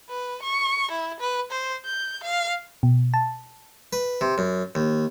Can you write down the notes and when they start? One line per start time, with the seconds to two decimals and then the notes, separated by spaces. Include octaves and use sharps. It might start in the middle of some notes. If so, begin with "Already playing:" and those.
0.10 B4
0.43 C#6
0.91 E4
1.20 B4
1.51 C5
1.85 G6
2.24 F5
2.83 B2
3.14 A5
3.93 B4
4.21 C3
4.38 F#2
4.75 D#2